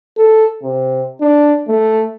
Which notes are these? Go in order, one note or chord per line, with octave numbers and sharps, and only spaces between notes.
A4
C3
D4
A3